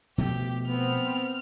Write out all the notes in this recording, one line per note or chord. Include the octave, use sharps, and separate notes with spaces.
B2 F3 A3 G4
B3 C4 F6